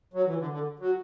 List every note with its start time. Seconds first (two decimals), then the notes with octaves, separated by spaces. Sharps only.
0.14 F#3
0.26 E3
0.38 D3
0.51 D3
0.79 F#3